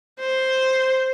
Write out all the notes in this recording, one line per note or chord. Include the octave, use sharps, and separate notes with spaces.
C5